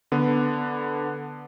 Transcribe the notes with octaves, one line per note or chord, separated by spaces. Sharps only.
D3 B3